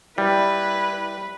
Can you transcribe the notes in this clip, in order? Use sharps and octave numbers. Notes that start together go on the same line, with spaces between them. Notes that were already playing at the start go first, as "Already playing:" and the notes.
G3 E4 B4